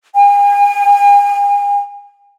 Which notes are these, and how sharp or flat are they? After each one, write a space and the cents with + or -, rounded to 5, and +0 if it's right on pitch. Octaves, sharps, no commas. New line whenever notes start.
G#5 -40